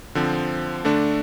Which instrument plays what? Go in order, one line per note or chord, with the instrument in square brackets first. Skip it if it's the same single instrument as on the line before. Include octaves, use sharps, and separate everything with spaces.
[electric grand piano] D3 F3 C4
D3 A3 D4